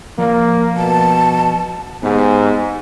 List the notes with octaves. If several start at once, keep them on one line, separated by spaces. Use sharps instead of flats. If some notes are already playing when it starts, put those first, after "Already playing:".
F3 A#3 D5
B2 A5
G#2 B3 G4 G#5